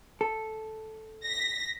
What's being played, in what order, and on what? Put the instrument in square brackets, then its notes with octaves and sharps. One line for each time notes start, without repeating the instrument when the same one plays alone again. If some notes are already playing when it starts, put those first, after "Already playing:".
[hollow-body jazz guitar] A4
[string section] A#6 B6